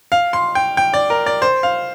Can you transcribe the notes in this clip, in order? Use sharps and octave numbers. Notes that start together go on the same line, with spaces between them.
F5
C6
G5
G5
D5
A#4
D5
C5
F5